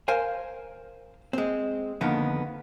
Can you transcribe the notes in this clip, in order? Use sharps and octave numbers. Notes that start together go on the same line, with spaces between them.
A#4 C5 F5 G#5
G#3 C4
F2 D3 D#3 A#3 B3